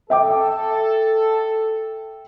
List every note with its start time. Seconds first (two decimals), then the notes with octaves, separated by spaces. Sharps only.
0.10 A4 E5 G5 D6